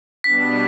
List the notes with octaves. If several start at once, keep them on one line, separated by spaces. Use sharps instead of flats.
B2 G3 B3 D4 B6